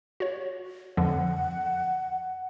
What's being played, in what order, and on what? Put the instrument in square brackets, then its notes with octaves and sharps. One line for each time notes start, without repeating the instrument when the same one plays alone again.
[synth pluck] F#4 C#5
[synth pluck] F2 D3 F3 [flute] F#5